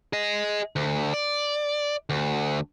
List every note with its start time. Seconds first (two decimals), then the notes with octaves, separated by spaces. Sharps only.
0.13 G#4 D#5
0.76 D2
1.14 D5
2.10 D2